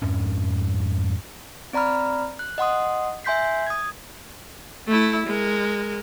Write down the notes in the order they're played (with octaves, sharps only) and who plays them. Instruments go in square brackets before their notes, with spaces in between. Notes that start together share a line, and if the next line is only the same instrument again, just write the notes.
[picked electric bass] F2 G#2 C#4
[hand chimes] C4 D5 A#5 B5 F6
F#6
D#5 F#5 C6 D#6
E5 G#5 C6 G6 B6 C7
D#6 G#6
[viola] A3 E4
G#3 A#4